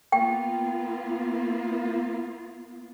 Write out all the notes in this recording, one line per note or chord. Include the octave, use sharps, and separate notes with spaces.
A#3 B3 F4 G5